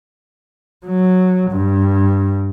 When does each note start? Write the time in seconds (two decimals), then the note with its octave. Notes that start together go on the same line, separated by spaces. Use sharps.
0.86 F#3
1.52 G2